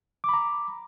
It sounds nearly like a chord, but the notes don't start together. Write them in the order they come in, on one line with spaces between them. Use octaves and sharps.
D6 B5 A#5